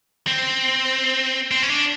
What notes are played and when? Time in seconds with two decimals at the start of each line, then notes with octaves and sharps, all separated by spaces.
0.27 C4
1.51 C4
1.62 C#4
1.70 D4